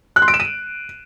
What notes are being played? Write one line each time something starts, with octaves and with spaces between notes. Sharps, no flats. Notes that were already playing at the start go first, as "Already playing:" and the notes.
F#6
C6
D7
E7
D#7